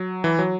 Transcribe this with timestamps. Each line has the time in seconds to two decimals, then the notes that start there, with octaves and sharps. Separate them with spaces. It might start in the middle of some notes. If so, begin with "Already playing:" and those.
Already playing: F#3
0.24 E3
0.39 F#3